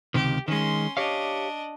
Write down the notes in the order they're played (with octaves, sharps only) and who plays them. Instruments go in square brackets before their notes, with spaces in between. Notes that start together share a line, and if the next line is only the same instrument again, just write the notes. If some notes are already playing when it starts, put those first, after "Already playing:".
[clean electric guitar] C#2 C3 D#3 [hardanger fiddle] G4
[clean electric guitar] D#3 G#3 [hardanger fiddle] C#4 C6
[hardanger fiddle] D4 D#5 [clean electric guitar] G4 C#5 F5